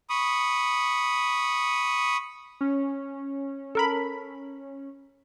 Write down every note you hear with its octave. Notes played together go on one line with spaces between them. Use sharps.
B5 C#6 D#6
C#4
A4 A#4 B5